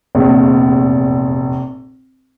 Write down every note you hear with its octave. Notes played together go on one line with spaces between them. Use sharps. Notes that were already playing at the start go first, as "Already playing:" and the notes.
F1 A#1 E2